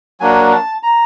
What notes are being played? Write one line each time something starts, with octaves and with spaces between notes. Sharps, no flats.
F#3 A#3 D4 G#5
A5
A#5